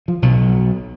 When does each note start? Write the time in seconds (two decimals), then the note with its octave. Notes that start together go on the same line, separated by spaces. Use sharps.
0.08 F3
0.22 B1 B2 F#3